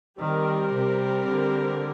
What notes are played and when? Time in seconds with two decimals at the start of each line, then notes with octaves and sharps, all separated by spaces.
0.19 D#3 G3 C4 G4 A#4
0.73 C3
1.28 D3